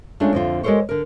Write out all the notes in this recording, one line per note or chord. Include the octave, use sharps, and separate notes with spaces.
G#3 A3 C#4 D4 F4
F2 D3 F4
G#3 G4 A4 A#4 C5 C#5
D3 A#4